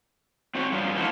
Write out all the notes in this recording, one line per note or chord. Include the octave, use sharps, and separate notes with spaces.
C4 F#4 C5 C#5
G2 F3 F#3
E3 G#3 A#3 F#4 G#4 A4